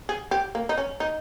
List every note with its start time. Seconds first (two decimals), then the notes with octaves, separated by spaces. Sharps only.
0.09 G#4
0.31 G4
0.55 A#3
0.69 D#4
0.77 C#4
1.00 D#4